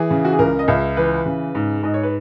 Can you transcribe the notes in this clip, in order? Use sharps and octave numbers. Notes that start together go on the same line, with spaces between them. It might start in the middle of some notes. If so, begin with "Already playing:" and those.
Already playing: E3 G#4
C#3
F#4
G#4
C#2 A#4
D#5
C#2 E5
E3 B4
C#3
G#2
G#2 D#5
C#5
B4